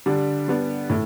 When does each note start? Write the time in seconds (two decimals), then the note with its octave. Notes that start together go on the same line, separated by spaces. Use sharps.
0.06 D3 G3 D4
0.48 G3 B3 D4
0.90 A2